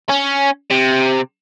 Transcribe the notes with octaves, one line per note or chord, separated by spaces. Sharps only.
C#4
C3